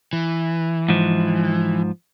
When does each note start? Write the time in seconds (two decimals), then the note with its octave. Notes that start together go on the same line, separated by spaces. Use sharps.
0.13 E3
0.89 G#2 F3